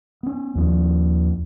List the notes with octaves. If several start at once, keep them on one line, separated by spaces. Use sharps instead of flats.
B3 C#4
D#2 F3